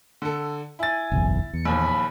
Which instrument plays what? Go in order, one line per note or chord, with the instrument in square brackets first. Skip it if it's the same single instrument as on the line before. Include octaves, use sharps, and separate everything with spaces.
[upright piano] D3 A4
[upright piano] E4 A6 [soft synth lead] G#5
[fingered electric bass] F#1 B1 E2
[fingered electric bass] E2 [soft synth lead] C#7
[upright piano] A#1 D#2 [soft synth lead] B5